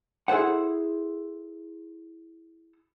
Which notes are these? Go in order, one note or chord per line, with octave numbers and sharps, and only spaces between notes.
E4 G#4 A4 C5 F#5